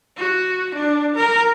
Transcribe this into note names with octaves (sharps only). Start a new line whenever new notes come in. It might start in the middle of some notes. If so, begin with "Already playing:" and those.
F#4
D4
A#4